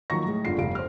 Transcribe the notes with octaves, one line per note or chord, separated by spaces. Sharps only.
D#3 F3 F#3 A#3 C#6 A#6
A2 G#3
G1 D3 F4 C7
F1 G2 F5 D7
C5 F6